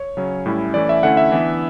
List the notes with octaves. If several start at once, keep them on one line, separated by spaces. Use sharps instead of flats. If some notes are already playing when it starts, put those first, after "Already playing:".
Already playing: C#5
C#3 F#3 C#4
A2 G3 C#4 E4
E3 A3 C#4 E4 D5
E5
D3 A3 C#4 E4 F#5
E5
E3 B3 D4